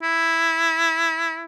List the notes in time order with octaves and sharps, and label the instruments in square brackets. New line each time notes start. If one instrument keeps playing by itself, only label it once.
[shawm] E4